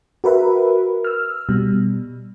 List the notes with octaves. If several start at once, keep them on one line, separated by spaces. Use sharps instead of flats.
F#4 A#4 B4 E5
E6 F6
B2 G3